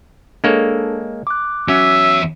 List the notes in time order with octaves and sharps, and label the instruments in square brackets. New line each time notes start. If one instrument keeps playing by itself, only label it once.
[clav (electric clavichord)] G#3 A#3 C#5 [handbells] D4 A4
[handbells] D6 F#6
[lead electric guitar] E2 E5 [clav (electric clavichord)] F#3 C#4 [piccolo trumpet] E6